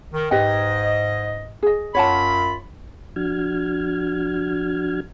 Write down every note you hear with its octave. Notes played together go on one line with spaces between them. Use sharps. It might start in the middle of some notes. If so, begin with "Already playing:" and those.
D#3
G#2 G4 B4 D#5 G5
G#4 D#5
F#2 F4 C#5 F#5 A5 B5
F3 D4 F#4 F6 G#6